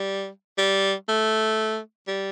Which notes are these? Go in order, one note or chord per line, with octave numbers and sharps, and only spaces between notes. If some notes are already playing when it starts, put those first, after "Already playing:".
Already playing: G3
G3
A3
G3